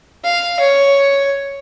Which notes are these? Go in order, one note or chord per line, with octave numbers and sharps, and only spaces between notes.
F5
C#5